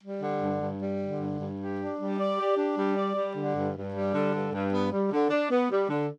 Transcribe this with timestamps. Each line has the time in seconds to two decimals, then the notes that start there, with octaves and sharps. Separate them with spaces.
0.02 G3
0.22 D3
0.42 G2
0.61 G2
0.81 G3
1.01 D3
1.20 G2
1.40 G2
1.60 G4
1.79 D4
1.98 G3
2.18 D5
2.37 G4
2.57 D4
2.76 G3
2.96 D5
3.15 G3
3.35 D3
3.55 G2
3.74 G2
3.94 G3
4.13 D3
4.33 G2
4.52 G2
4.72 B3
4.92 G3
5.12 D3
5.30 D4
5.50 B3
5.70 G3
5.89 D3